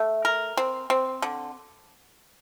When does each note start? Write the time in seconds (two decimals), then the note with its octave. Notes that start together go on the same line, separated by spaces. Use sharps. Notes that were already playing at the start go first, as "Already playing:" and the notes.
Already playing: A3
0.25 A#4
0.57 C4
0.90 C4
1.22 D3